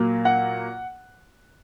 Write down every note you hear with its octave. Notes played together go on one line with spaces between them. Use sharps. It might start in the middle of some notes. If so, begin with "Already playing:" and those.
Already playing: A#2 F#3 A#3
F#5